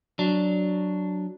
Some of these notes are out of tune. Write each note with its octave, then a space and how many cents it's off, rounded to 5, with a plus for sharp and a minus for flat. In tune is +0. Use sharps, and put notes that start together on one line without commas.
F#3 +0 D4 +0